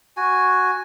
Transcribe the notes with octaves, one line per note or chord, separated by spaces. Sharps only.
F#4 G#5